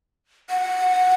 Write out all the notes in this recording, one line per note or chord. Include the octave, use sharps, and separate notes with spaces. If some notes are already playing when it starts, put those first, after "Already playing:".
F#5